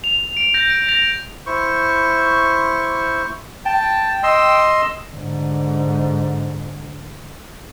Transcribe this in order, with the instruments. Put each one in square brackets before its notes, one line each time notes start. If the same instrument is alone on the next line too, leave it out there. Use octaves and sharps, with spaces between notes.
[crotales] F7
D7
G6 A#6
D7
A#6 F7
[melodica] E4 C5 C#6
[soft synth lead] G5 [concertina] A5
[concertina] D#5 C6 E6
[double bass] G#2 D3